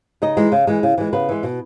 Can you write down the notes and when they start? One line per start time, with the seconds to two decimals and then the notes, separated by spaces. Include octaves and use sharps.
0.22 C#3 D#4 D#5
0.37 E3 G#3
0.52 C#3
0.67 E3 G#3
0.83 C#3
0.98 E3 G#3
1.13 C#3 B3 B4
1.29 E3 G#3
1.43 B2